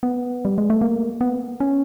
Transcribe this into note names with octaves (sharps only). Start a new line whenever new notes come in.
B3
G3
G#3
A3
A#3
B3
C#4